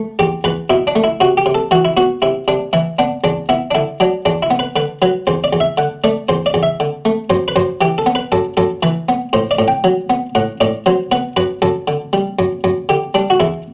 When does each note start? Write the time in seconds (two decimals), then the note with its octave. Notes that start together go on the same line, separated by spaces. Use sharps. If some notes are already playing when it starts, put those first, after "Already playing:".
Already playing: A3
0.19 E2 G4
0.44 E2 B4
0.70 B2 E4
0.87 D4
0.95 A3
1.04 E4
1.20 C3 F#4
1.37 G4
1.46 C3
1.55 A4
1.71 E3 F#4
1.85 E4
1.97 B3 F#4
2.22 C3 E4
2.48 C3 D4
2.73 E3 E4
2.99 B3 D4
3.24 E2 D4
3.49 B3 E4
3.71 D4
3.75 D3 E4
4.00 F#3 D4
4.25 E2 D4
4.43 E4
4.50 B3
4.59 B4
4.76 D3 B4
5.02 F#3 B4
5.27 E2 C5
5.44 D5
5.53 E2
5.60 E5
5.78 D3 F#5
6.04 A3 D5
6.29 E2 C5
6.46 D5
6.54 E2
6.63 E5
6.80 D3
7.05 A3
7.30 F#2 C5
7.48 B4
7.56 F#2 C5
7.81 E3 G4
7.98 A4
8.06 B3
8.15 B4
8.32 F#2 A4
8.57 F#2 A4
8.83 E3 B4
9.09 B3
9.33 A2 C5
9.51 D5
9.59 A2
9.68 G5
9.84 F#3
10.10 B3
10.35 A2 F#5
10.60 A2 D5
10.86 F#3 C5
11.11 B3 B4
11.36 F#2 B4
11.62 F#2 A4
11.88 D3
12.13 G3
12.39 F#2
12.64 F#2
12.89 D3 G4
13.14 G3 D4
13.30 F#4
13.40 E2 E4